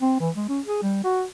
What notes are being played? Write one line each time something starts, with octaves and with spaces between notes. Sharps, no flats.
C4
E3
G#3
C#4
G#4
G3
F#4